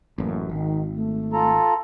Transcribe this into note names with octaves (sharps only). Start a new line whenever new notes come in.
A1 F#2 A#3
G#1 D#3
A3
F4 A4 A#5